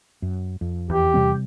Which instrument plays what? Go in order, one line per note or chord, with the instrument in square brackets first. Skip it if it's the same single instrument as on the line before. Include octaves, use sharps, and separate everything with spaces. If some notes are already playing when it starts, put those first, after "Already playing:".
[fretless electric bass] F#2
F2
[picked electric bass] E2 [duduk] G4
[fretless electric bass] C3 G3 C4